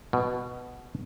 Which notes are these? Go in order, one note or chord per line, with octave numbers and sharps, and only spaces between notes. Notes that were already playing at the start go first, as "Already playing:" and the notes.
B2